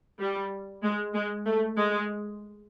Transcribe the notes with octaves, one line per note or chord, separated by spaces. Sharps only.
G3
G#3
G#3
A3
G#3